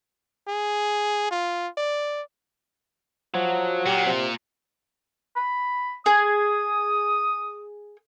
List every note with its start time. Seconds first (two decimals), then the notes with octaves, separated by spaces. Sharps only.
0.48 G#4
1.31 F4
1.77 D5
3.34 F3 F#3
3.86 A#2 G4
4.06 C3
5.36 B5
6.06 G#4 D#6